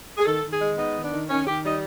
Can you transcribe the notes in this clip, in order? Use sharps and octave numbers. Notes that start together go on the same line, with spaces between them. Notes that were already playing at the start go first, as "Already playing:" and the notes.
G#4
D#3 A4
D#3
G#4
G#3
B3 D#4
D#3
D4
D#3
D#3 C#4
D#3 G4
G3 D#4